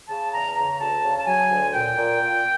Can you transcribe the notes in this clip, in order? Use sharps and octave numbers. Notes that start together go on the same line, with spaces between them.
C#3 A5
E2 A#5
C#3 A#5
D2 A5
C#3
A5
F#3 G#5
D2
A#2 G5
A#2
A#2